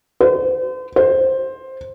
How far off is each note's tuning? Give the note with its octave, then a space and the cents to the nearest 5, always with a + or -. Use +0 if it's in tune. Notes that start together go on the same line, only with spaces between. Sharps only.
C5 -40
C5 +10